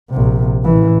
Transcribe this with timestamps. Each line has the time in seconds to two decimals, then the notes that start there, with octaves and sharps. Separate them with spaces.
0.10 A#1 C3
0.64 A1 E3